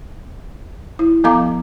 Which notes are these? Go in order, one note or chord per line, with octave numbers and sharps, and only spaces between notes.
E4
F3 B3 A4 F5 A#5 D6